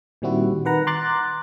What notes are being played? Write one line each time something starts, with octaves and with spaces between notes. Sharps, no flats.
A#2 D#3 G3 C4 E4 F#4
D#3 B4 F#5 A#5
A#5 C6 D6 F#6 A6